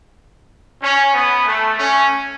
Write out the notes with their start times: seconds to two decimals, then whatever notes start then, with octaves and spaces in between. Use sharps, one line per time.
0.83 C#4
1.14 B3
1.46 A3
1.79 C#4